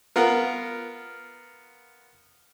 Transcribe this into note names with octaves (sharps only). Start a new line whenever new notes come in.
B3 F4 A#4